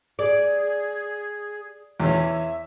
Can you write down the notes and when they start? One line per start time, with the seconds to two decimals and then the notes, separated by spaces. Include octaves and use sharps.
0.19 G#4 D5
2.00 E2 C#4 E5